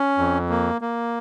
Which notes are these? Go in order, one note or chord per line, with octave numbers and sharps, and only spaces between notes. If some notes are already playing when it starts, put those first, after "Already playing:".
Already playing: C#4
F2
A#3
A#3